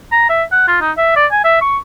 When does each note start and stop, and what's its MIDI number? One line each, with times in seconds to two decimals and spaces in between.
0.12 0.26 82
0.29 0.43 76
0.52 0.64 78
0.68 0.78 65
0.81 0.92 63
0.97 1.15 76
1.16 1.26 74
1.32 1.43 80
1.44 1.60 76
1.61 1.78 85